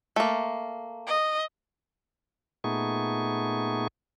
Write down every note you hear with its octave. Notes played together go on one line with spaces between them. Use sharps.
A3 A#3
D#5
A#2 A3 B3 D#4 G#4 C#6